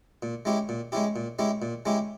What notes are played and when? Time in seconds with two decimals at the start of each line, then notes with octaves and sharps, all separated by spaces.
0.23 A#2
0.45 G#3 C#4 E4 G4
0.69 A#2
0.92 G#3 C#4 E4 G4
1.16 A#2
1.39 G#3 C#4 E4 G4
1.62 A#2
1.85 G#3 C#4 E4 G4